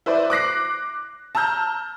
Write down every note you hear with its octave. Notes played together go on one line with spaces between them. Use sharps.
E4 B4 C5 D5
D6 F#6 A#6 C7
A5 A#5 E6 F6 G6